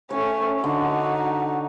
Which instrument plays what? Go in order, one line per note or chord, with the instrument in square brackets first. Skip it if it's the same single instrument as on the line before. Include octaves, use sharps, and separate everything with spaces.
[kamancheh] A3 C#4 [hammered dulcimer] C#5
[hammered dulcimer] D3 [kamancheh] D#4 F#4